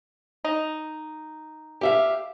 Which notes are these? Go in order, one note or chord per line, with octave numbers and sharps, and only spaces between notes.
D#4
G4 E5 F5